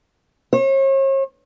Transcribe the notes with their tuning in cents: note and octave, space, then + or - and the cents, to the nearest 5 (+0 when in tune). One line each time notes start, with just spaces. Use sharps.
C#5 -40